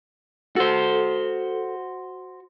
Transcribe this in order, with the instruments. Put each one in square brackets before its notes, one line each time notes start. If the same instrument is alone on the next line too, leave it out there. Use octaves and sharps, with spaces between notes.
[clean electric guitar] F#4 C5 [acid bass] A4